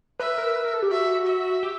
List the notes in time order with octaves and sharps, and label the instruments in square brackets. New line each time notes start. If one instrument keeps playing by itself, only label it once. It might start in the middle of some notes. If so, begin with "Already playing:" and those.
[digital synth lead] B4 [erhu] E5
[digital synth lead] A#4
B4
A#4
A4
G4
[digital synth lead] F#4 [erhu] E5
[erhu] E5
[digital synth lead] G4